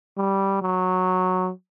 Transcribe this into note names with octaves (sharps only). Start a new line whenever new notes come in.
G3
F#3